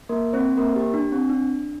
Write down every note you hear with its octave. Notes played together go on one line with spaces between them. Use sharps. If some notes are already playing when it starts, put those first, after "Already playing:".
A#3 A#4
C4 C5
A#3 A#4
G4
D4
C4
D4